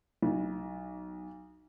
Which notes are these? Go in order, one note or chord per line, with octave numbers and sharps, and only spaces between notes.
B1